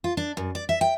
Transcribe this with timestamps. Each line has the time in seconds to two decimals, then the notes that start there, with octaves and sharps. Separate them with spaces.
0.04 F4
0.17 D4
0.37 F#2
0.55 D5
0.69 E5
0.81 G5